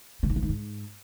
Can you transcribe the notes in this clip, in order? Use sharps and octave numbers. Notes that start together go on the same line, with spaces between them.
C#3
D#3
E3
D#3
G#2